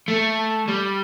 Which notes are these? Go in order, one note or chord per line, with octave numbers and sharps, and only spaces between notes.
A3
G3